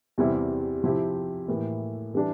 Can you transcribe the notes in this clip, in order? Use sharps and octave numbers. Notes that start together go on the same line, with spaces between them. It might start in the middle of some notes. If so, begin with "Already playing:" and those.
E2 C3 G3 C4 E4
C3 F3 C4 E4 G4
A2 E3 A#3 E4 G4
E3 G3 D4 G4